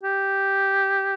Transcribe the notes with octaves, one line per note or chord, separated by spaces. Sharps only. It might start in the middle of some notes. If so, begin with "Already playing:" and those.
G4